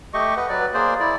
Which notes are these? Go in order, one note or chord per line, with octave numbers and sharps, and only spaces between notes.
A3 G4 D#5 C#6
B4 D#5 F#5
F#3 B4 D5
A#3 G#4 C5 D5
E4 D5